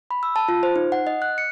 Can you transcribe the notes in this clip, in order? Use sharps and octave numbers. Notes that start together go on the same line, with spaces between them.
B5
E6
A5
F4
C5
D#4
F#5
D#5
F#6
C#7